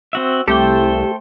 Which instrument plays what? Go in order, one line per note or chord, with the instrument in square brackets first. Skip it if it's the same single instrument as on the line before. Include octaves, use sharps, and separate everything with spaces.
[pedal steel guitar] C4 F#4 E5
[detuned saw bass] C2 [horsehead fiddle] A3 [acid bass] G4 [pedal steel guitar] A4 C5 G5